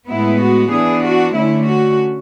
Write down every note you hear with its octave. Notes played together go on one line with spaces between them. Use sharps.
A2 G#3 B3 E4
F#4
E3 B3 D4 G#4
F#4
D3 A3 C#4 E4
F#4